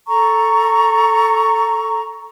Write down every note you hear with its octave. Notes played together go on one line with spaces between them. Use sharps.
A4 A#5 C#6